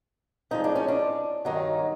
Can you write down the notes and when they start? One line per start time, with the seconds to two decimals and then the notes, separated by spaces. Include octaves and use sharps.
0.51 A2 F3 G#3 D#4
0.64 D4
0.75 C#4
0.88 D4
1.45 G2 D#3 F#3 D#4